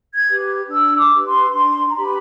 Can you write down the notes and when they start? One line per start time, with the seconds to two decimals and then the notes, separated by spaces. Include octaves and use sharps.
0.13 G#6
0.26 G4 B4
0.68 D4 E6
0.97 D6
1.10 G4 B4
1.25 C6
1.52 D4 C6
1.89 A#5
1.95 G4 B4 B5